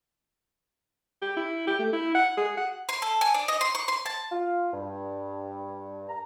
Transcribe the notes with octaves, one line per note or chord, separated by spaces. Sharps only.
G4
E4
G4
A3
E4
F#5
G#4
F#5
C6
A4
G#5
D4
D#5
C6
C#6
C6
A5
F4
G2
A#5